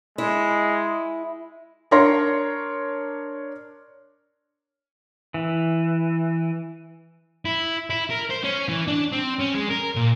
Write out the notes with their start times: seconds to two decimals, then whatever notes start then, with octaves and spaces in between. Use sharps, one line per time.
0.18 G#3 E4
1.91 D4 A#4 C#5 C6 A#6
5.34 E3
7.45 E4
7.90 E4
8.10 A#4
8.31 C5
8.44 C#4
8.69 E3
8.88 D4
9.12 C4
9.39 C#4
9.54 G#3
9.69 A#4
9.95 A#2